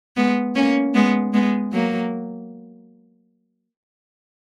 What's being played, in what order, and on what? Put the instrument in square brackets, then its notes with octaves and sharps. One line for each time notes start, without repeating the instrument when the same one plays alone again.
[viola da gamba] G#3 B3
A#3 C#4
G#3 B3
G#3 B3
F#3 A#3